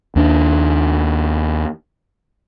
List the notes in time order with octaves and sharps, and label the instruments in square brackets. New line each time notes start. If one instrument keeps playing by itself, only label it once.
[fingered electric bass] D#2 D4